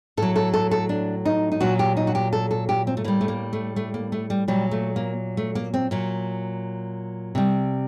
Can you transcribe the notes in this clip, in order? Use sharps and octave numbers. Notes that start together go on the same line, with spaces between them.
A2 F#3 A4
A4
A4
A4
D4
D#4
D#4
A#2 F#3 F#4
G4
D#4
F#4
G4
A4
A4
G4
C4
A3
A2 G3 A#3
A3
A#3
A3
A3
A#3
A3
G3
A#2 F#3 G3
A3
A#3
A3
A#3
C4
A#2 F#3
C3 G3